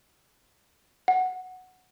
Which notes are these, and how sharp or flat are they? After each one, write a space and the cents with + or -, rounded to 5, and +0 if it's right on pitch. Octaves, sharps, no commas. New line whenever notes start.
F#5 +0